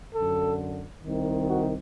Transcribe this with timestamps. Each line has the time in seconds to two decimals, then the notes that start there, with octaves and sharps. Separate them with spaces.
0.14 F#2 D3 A4
1.04 C2 C3 D#3
1.48 F#4